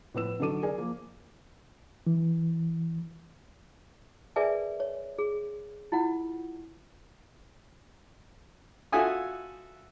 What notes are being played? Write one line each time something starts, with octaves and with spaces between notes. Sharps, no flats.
A2 F3 B3 B4 E6 E7
D3 F#3 D#4 A4 D6 D#7
G#4 A#4 D5 G#5
F3 A#3
E3
G#4 A#4 B4 D5 E5 G#5
C#5
G#4
E4 F4 F#5
F4 F#4 A4 E5 G#5 D#6